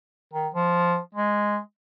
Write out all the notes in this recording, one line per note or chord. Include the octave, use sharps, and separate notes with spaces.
D#3
F3
G#3